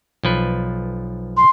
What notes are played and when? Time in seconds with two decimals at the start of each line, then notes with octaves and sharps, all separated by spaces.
0.23 B1 F3 B4
1.36 C6